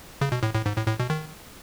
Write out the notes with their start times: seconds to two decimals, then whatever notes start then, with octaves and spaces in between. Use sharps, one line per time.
0.21 C#3
0.32 B2
0.43 A2
0.54 A2
0.66 G#2
0.77 A2
0.87 A2
1.00 B2
1.10 D#3